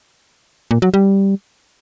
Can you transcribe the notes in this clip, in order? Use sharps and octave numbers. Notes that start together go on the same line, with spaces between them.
A#2
F#3
G3